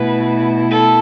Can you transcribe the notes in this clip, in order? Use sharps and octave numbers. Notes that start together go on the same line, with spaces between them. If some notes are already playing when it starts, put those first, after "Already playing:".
Already playing: B2 A3 E4 B4
A4